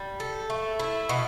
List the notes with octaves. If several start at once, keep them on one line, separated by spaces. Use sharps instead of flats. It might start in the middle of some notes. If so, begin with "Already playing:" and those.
Already playing: G3
A4
A3
E4
B2